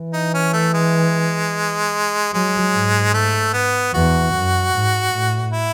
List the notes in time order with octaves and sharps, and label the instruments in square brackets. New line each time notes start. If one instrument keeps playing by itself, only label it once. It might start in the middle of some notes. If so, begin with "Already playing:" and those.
Already playing: [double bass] E3
[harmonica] D#4
C#4
A3
G#3
[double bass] F#3 [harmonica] G#3
[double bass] G#2
[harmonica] A3
B3
[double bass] E2 [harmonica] F#4
[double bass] F#2
G#2
A2
[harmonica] E4